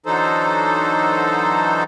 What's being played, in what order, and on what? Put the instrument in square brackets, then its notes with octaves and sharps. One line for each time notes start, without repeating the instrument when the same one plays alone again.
[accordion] D3 E3 F#3 D#4 A4 C5